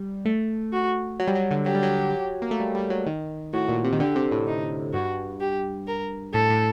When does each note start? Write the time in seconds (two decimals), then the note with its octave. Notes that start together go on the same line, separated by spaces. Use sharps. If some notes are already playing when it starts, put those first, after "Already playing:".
Already playing: G3
0.25 A3
0.72 F#4
1.20 F#3
1.28 G3
1.35 F#3
1.51 D3
1.66 F#3 G4
1.75 G3
1.83 F#3
2.42 A#3
2.51 A3
2.60 G3
2.75 G3
2.90 F#3
3.06 D#3
3.53 A2 F#4
3.69 A#2
3.85 C3
3.93 D#3
4.00 D3 G4
4.15 C3
4.32 A2
4.47 D#4
4.93 G2 F#4
5.40 G4
5.87 A#4
6.34 A2 A4
6.50 A2